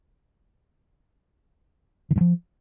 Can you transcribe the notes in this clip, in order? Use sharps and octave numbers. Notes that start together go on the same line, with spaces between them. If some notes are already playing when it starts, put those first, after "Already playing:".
D#3
G2
F3